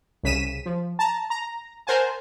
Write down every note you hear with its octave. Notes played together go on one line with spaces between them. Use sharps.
C2 C#3 B6 D#7 E7
F3
A5 A#5
A#5
A#4 C5 F#5 G#5 A5